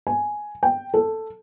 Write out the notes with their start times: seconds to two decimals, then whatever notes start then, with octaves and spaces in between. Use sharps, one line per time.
0.07 G#5
0.63 G5
0.94 A4